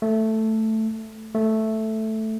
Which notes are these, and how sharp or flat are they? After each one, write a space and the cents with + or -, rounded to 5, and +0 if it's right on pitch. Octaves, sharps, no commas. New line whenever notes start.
A3 +5
A3 +0